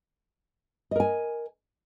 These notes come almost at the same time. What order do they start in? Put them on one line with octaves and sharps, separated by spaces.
D#5 A#4 G#5